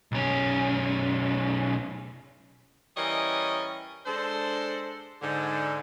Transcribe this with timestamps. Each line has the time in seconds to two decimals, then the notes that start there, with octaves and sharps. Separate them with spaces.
0.12 B1 C#4
2.97 E3 G3 C#4 A#4 C#5 D#5
4.06 G#3 D4 A4 C5
5.22 G#2 D3